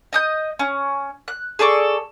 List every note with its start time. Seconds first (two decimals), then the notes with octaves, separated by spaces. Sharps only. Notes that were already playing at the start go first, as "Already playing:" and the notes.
0.13 D#5 D#6 G6
0.59 C#4
1.28 F#6
1.59 G#4 A4 D5 C#6